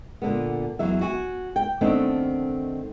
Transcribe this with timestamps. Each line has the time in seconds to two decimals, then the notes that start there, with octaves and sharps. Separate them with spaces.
0.22 A#2 D3 B3
0.79 E2 F#3 E5
1.01 F#4 G#5
1.56 G5
1.81 D#3 A3 B3 C4 D4